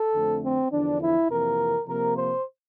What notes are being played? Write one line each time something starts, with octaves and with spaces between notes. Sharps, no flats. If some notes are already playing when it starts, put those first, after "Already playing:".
Already playing: A4
F2 D3 A3 C4
C4
E2 D3 F3 D4
E4
F2 C3 E3 A#3 A#4
C3 F3 A#3 A#4
C5